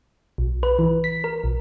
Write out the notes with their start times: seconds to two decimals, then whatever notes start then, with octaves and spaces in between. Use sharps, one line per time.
0.38 B1
0.63 B4
0.79 E3
1.04 B6
1.24 A#4
1.44 B1